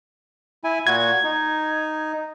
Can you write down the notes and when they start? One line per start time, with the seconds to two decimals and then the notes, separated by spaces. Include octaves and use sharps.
0.64 E4 G#5
0.87 A#2 F#4 G#6
1.24 D#4